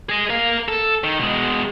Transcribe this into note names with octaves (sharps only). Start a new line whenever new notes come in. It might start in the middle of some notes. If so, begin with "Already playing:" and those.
G#4 D#5
A#4 F5
A4
D#3
B2 G#3